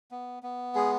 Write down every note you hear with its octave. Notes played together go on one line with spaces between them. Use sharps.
B3
B3
G#3 G#4